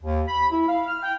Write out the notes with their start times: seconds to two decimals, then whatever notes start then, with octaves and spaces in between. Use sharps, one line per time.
0.03 D#2
0.28 B5
0.51 E4
0.69 F5
0.88 F6
1.03 G5